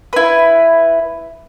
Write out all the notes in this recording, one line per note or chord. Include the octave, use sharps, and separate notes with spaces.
E4 B4